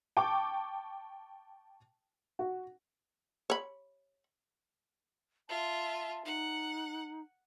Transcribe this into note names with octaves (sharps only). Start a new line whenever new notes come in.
G5 A5 C#6 D6
F#4
C#5 B5
F4 E5 A5
D#4 F#5